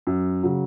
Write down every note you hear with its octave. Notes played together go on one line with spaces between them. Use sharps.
F#2
C#3 F#3